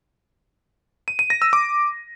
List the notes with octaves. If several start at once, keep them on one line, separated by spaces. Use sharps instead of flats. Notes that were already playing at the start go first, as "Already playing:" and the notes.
D#7
D#7
A#6
E6
D6